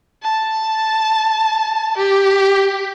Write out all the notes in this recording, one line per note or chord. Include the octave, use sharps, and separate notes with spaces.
A5
G4